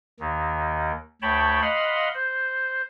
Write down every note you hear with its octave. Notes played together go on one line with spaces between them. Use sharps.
D#2 D#3
D2 C#5 G5 A5 B5
D#5 F5 F#5 B5 C6
C5